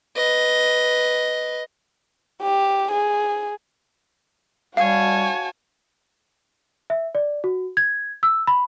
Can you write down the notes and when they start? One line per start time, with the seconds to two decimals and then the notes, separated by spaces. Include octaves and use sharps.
0.16 B4 D#5
2.42 G4
2.91 G#4
4.77 G3 F#4 C#5 F5 G#5 A5
6.90 E5
7.15 D5
7.44 F#4
7.77 G#6
8.23 E6
8.47 B5